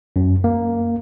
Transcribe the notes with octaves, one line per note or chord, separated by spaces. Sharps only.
F#2
A#3